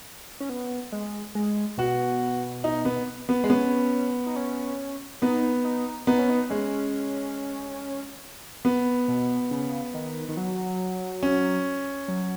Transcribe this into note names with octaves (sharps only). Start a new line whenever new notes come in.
C#4
B3
G#3
G#3
B2 F#4
D#4
B3
B3
G#3
B3 C#4
D#4
C#4
B3 D#4
D#4
B3 D#4
C#4
D#4
G#3 C#4
B3
B2
C#3
D#3
D#3
F#3
C#4
F#3